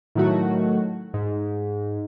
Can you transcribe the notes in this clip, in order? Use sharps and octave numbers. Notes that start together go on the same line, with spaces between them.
A2 D#3 F#3 A3 F#4
G#2